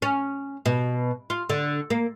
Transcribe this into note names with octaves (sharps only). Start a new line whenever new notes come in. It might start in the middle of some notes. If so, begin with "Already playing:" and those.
C#4
B2
F4
D3
A#3